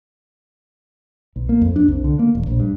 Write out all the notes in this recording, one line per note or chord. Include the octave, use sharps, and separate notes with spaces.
B1
A#3
F2
D4
C2
D3
A#3
E1
A#1
G2